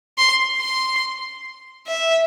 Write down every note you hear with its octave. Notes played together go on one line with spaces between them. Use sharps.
C6
C6
E5